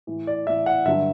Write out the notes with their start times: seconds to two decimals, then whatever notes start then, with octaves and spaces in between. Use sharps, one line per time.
0.07 A2 E3
0.27 D5
0.47 A2 E3 E5
0.66 F#5
0.85 G2 D3 F#3 E5